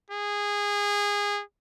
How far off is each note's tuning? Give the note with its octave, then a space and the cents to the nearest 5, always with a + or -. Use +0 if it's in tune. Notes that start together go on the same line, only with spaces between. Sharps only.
G#4 -20